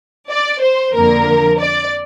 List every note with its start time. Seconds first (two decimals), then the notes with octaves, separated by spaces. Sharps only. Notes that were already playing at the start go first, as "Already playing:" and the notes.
0.30 D5
0.62 C5
0.95 F2 D3 F3 A#3 A#4
1.60 D5